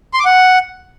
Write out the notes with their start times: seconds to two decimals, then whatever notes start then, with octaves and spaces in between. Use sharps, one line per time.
0.14 C6
0.20 D6
0.25 F#5